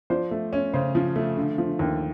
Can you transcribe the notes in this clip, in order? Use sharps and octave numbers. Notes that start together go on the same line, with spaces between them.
F3 C5 D5
A3
C#4
C#3 C5
F3
A3
D3
F3
D#2